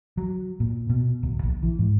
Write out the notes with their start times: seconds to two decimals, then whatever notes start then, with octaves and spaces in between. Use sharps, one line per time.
0.17 F#3
0.60 A#2
0.90 B2
1.23 D1
1.43 A#1
1.63 E3
1.79 G#2